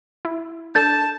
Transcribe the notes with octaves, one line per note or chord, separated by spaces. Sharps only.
E4
D4 A4 A5 G6 A6